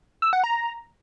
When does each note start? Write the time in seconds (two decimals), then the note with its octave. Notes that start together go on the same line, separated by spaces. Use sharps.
0.22 E6
0.33 F#5
0.44 A#5